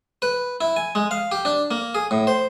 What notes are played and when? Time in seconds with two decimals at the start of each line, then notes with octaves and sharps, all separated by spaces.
0.22 B4
0.61 E4
0.76 G#5
0.95 G#3
1.11 F5
1.32 G4
1.45 D4
1.71 A#3
1.95 G#4
2.11 A2
2.27 C5